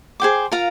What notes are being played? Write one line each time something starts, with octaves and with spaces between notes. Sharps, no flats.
G#4 C5 G5 D6
F4 A#4 F5 A#5